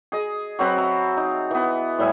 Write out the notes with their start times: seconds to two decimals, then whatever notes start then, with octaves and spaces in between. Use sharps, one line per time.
0.12 G#4 D#5
0.59 F#3 C4 B4
0.77 E5 A#5
1.17 D#4
1.51 E3 B3
1.98 A2 G3 E5 G#5